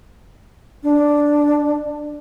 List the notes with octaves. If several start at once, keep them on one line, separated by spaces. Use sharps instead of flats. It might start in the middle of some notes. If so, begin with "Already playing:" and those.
D4